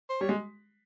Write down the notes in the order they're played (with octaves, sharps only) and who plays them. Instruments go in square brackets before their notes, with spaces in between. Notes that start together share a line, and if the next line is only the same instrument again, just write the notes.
[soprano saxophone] C5
[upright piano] G3 [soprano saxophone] C#5
[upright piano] G#3